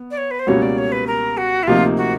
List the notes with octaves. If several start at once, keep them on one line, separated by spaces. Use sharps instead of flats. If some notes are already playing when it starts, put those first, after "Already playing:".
Already playing: B3
D5
C#5
B4
C5
C#2 B2 G3 A#3 C#4 C#5
D5
C#5
B4
A#4
F#4
E4
D2 C3 F3 A#3 D#4 F4
F#4